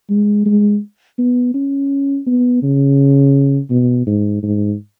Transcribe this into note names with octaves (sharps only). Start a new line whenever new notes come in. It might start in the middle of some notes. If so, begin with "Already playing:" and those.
G#3
G#3
B3
C#4
B3
C#3
B2
G#2
G#2